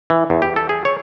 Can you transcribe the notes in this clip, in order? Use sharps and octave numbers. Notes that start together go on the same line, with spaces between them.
E3
E2
G4
A4
G#4
C#5